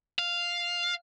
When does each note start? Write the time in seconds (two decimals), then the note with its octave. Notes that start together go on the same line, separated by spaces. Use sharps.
0.19 F5